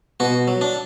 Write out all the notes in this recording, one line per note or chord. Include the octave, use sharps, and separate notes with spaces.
B2 F#4
F#3
D4